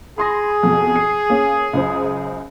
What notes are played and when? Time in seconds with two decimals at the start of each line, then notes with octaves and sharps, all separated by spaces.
0.18 G#4 B5 C6 A#6
0.63 F2 B2
0.96 C7
1.30 A#3 C#4
1.73 C#2 F#2 C5